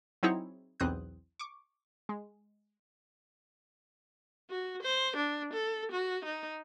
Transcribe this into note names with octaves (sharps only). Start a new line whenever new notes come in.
F#3 C4 D#4 E4 G#4 C#5
B1 E2 C4 D#6 F#6 G6
C#6 D6
G#3
F#4
C5
D4
A4
F#4
D#4